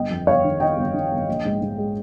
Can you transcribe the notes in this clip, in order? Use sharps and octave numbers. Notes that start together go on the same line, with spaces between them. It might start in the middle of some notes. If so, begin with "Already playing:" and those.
Already playing: G1 D#5 G5
F2
G1 C#5 F5
D#3
D#3 D#5 G5
G1
D#3
G1
A#1
G#2
G#2
G#3